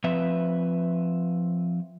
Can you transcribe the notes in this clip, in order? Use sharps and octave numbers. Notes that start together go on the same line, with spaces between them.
F3 C4 B4 E5